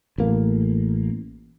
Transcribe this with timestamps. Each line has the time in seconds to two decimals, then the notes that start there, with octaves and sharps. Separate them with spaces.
0.18 A1 A#3